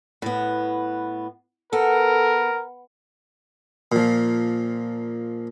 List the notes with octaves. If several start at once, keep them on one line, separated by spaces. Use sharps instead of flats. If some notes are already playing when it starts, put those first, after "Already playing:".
A2 B3
B3 A4 A#4
A#2 F3